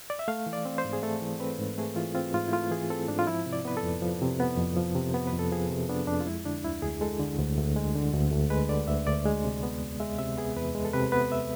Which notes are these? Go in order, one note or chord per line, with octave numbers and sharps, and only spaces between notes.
D5
E5
A3 F5
E3
D5
C4
C5
G#2
G#4
A3 A4
E3
C4 B4
G#2
A3 G#4
E3 F4
C4 F4
G#2 F4
E4
A3 F4
E3 G#4
C4 A4
G#2 D4
F4
F3 E4
C3
D5
B3 B4
A4
F2
F3
C3
B3
F2
F3
C3
B3
B4
F2
A4
F3 G#4
C3
B3 D4
F2 D4
F4
G#3 E4
D3 D4
D2 E4
D2 G#4
G#3 A4
D3
D2
D2
G#3
D3
D2
D2
G#3 B4
D3 D5
D2 E5
D2 D5
G#3
C3
B3
E2
G#3 E5
C3 E5
B3 G#4
E2 B4
G#3
A4
C3 B4
B3 B4
E5